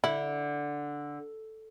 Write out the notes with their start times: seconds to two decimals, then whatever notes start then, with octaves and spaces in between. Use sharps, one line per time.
0.04 D3 E4